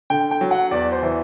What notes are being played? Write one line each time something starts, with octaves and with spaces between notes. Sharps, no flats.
D3 G5
G5
F#3
F#5
E2 D5
C5
E3